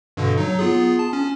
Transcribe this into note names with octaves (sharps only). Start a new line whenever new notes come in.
G2 B2 D3
F#3 D#4
B3 F4 G#4
A5
C#4